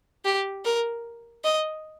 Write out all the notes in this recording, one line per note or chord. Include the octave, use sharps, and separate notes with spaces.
G4
A#4
D#5